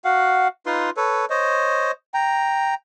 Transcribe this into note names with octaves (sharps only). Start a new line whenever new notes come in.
F#4 F5 F#5
D#4 F4 B4 C6
A4 B4 C#5
C5 C#5 D#5
G5 A#5